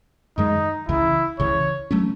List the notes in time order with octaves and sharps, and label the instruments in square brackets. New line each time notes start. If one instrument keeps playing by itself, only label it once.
[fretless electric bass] F#2 D#3 G#3 [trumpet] D#4
[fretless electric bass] C#2 C#3 E3 [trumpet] E4
[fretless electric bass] C#2 C#3 E3 [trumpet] C#5
[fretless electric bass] F#3 A3 C#4